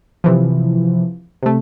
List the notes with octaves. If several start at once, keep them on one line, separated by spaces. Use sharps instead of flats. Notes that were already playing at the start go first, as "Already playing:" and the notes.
C3 E3 F3
C3 A3